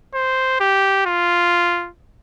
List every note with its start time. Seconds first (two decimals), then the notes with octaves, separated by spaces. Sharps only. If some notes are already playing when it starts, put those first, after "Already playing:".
0.14 C5
0.60 G4
1.06 F4